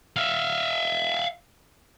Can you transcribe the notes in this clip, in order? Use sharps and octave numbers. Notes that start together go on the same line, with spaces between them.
E5 F5